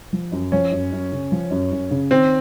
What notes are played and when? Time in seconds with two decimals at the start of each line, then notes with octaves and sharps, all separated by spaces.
0.13 F3
0.32 F#2
0.52 F3 C#4
0.72 F#2
0.92 F#2
1.12 C#3
1.32 F3
1.51 F#2
1.72 F#2
1.91 C#3
2.10 D#3 C4